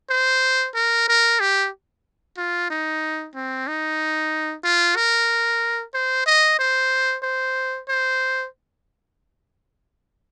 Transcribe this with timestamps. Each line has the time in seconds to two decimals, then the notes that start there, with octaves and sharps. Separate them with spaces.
0.10 C5
0.75 A#4
1.08 A#4
1.40 G4
2.37 F4
2.70 D#4
3.35 C4
3.68 D#4
4.64 F4
4.96 A#4
5.94 C5
6.26 D#5
6.59 C5
7.23 C5
7.88 C5